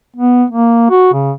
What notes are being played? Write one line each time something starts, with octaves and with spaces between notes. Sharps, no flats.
B3
A#3
F#4
C#3